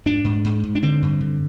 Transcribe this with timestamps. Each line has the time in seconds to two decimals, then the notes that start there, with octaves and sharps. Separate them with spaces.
0.06 G#2 D4
0.24 G#2
0.44 G#2
0.64 G#2
0.75 D4
0.82 D3 C4
1.02 G2
1.21 D3